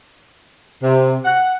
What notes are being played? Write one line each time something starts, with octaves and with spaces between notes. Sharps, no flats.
C3
F#5